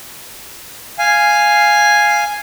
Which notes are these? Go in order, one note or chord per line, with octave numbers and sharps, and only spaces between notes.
F5 G#5